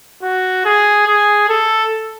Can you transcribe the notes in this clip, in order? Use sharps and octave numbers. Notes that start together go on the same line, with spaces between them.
F#4
G#4
G#4
A4